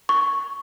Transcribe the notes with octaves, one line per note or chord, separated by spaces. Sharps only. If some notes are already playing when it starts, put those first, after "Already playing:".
C#6